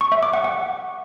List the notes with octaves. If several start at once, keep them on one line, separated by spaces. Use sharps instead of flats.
C#6
E5
D6
F#5
F#5